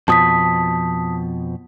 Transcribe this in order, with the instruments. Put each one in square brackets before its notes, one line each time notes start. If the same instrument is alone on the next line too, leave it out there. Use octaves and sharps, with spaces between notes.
[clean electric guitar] F2 B2 F3 [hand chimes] A5 D#6 B6